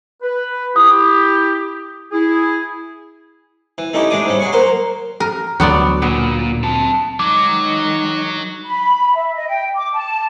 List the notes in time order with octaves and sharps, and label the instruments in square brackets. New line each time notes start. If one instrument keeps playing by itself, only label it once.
[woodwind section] B4
[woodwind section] E4 G4 [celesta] D#6
[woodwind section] E4 G#4
[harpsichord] E3
A3 C#4 D#4 E4 G4
A2 G#3 D4 D6 D#6
G#2 G3 C#4
F#3 G#4 C#6
F#3 A#3 A#4 C5 C6
[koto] A#4
[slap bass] D2 [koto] F#3 B3 D5
[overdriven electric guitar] A#2 [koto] B3
[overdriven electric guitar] C4 A5
[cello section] D#3 G#3 D#4 [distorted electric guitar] F#3 F#4 [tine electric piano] D6
[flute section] B5
E5
D#5
G5
D6
A5